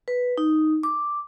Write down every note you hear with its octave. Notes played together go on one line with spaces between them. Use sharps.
B4
D#4
D6